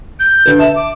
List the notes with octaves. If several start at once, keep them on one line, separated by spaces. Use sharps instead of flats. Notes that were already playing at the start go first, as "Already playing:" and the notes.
G6
D3 B4
E5 A5
D6